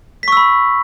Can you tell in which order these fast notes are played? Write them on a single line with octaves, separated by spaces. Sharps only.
B6 C#6 E6 B5